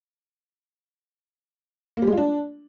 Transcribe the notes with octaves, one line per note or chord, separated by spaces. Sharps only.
A#3
G3
G#3
F4
D4